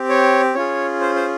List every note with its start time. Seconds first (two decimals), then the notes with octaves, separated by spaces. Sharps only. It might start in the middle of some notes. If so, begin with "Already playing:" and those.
Already playing: C4 G4
0.09 C#5
0.55 C#4 F4 G#4 C#5
1.00 C5
1.16 C5